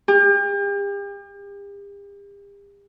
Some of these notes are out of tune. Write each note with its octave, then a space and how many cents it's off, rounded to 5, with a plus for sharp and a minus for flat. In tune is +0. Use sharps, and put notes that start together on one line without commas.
G4 +40